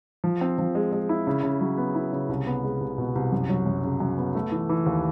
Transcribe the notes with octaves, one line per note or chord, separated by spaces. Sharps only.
F3
C4
F3
G#3
G#3
E4
C#3
C#3
F#3
B3
E4
C#3
C2
B3
G#3
C2
B2
C2
F#2
F#3
F#2
C#3
F#2
B3
A3
E3
E3
D#2